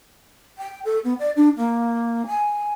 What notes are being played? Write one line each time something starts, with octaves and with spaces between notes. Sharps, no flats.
G5
A4
B3
D5
D4
A#3
G#5